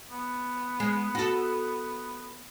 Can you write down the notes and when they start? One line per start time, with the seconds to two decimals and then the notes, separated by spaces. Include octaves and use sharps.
0.10 B3
0.80 G#3
1.15 F#4 A4